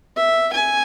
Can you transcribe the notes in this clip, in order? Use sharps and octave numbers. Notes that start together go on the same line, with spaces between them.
E5
G#5